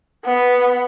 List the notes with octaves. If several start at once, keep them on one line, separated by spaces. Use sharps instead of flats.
B3